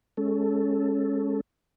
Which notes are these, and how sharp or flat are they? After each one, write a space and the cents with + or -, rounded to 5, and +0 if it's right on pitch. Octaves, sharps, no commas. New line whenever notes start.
G#3 +0 C#4 +0 A4 +0